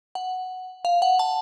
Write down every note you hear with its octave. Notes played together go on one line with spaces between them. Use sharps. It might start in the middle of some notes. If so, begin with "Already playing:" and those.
F#5
F5
F#5
A5